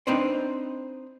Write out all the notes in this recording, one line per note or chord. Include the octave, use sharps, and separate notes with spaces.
C4 D4 D#4 B4 C5 D5